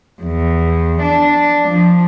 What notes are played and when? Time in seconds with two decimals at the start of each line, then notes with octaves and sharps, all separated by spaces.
0.23 E2
1.02 D4
1.69 F3